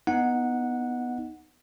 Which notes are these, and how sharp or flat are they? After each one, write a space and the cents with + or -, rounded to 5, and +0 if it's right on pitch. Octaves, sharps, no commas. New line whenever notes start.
B3 +0 D#4 +0 F#5 -10